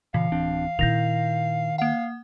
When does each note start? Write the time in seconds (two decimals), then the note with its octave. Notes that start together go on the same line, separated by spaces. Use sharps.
0.14 A#2 C#3 E3 F5
0.32 D1 C4 D4
0.79 A#2 D#3 E4 G6 A#6 F7
1.78 A#3 F5 F#5